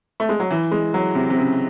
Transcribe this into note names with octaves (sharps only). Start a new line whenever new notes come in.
A3
G#3
F#3
E3
G#3
F#3
C3
C3
C#3